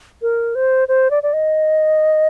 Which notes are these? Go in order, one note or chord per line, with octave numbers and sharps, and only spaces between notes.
A#4
C5
C5
D5
D5
D#5